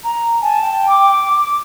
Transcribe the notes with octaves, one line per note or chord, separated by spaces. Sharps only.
A#5
G#5 A5
G5
D6